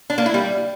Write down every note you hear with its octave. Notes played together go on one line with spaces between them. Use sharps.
D4
A#3
E4
G3